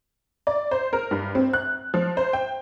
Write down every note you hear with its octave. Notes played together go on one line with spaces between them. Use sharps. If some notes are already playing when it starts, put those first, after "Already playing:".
D5
C5
A#4
G2
C4
F#6
F3
C5
G5